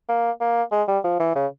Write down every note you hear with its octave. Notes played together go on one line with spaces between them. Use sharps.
A#3
A#3
G#3
G3
F3
E3
C#3